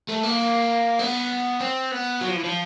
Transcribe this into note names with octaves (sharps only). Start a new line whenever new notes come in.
A3
A#3
B3
C4
B3
F#3
F3
E3
F3